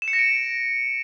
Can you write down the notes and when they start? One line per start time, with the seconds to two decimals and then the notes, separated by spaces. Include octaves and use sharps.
0.02 E7
0.08 C#7
0.13 A#6
0.19 D7